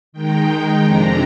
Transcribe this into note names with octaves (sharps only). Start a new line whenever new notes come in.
D#3 G#3 D#4 G5
F2 C3 F3 G#3 D4 A#5